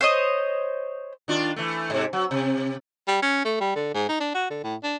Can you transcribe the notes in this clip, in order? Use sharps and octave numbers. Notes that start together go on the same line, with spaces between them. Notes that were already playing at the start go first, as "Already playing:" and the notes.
C5 C#5 D#5
D#3 D4 F4
E3 A3
G#2 C3
F#3
C3
G3
C#4
A3
G3
D3
G#2
D#4
D4
F#4
D3
A2
D4